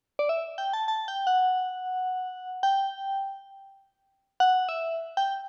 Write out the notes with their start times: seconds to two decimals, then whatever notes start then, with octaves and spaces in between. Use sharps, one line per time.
0.19 D5
0.29 E5
0.58 G5
0.73 A5
0.88 A5
1.08 G5
1.27 F#5
2.63 G5
4.40 F#5
4.69 E5
5.17 G5